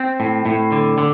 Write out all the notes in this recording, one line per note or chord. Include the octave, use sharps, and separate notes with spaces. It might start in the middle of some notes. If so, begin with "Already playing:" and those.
Already playing: C4
A2
A2
D3
D3